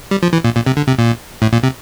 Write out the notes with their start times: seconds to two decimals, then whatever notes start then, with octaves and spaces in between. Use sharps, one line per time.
0.11 G3
0.23 F3
0.33 E3
0.44 A#2
0.55 A#2
0.66 C3
0.77 D3
0.88 C3
0.99 A#2
1.42 A2
1.53 A#2
1.63 C3